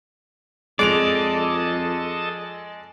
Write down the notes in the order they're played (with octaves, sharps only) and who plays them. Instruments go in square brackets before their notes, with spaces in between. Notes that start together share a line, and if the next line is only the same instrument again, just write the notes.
[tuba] F2 [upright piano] G#3 D7 F7 [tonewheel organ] A4 D#5 A5 [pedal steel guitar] D5